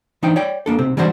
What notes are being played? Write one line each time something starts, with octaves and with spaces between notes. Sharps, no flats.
E3 D4 D#4 C5 G5
C#5 D5 G5
A#3 D4 A4
B1 C3 C4
E3 G3 G#3 D4 F#4 C5